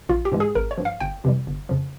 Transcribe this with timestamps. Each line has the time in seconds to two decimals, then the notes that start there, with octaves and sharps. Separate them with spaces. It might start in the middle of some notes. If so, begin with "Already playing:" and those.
0.09 A#1 F4
0.25 G4
0.32 G#2 E3 G#3
0.40 G#4
0.55 G#1 A#4
0.71 C#5
0.78 G2 F3
0.85 F5
1.00 G1 G5
1.24 F2 C3 E3 G3
1.47 G1
1.69 F2 C#3 F3